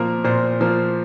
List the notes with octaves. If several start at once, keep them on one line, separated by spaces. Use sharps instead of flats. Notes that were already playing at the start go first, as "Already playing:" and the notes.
Already playing: A#2 F3 A#3 A#4
A#2 C5
F3 A#3